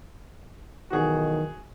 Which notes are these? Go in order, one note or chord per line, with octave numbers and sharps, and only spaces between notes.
B1 D#3 E3 F#4 G#4